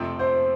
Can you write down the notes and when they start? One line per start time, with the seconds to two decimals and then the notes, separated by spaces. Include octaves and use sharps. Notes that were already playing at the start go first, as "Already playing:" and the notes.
Already playing: F2 C3 F3 A3 C4
0.19 C5